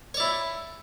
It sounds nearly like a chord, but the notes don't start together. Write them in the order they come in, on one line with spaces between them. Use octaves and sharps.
C#5 D5 E4